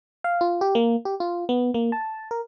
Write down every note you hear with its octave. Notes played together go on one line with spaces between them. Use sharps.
F5
F4
G4
A#3
G4
F4
B3
A#3
A5
A#4